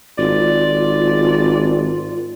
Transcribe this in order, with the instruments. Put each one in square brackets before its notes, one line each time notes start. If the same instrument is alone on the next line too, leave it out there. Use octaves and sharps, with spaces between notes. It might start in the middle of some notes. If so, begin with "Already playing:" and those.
[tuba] G#1 [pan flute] F4 [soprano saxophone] D5